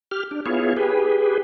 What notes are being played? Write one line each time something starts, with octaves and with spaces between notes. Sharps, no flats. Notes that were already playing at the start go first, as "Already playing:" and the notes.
G4 F6
D4
B3 E4 F4 G#4 C#5
G4 G#4 B4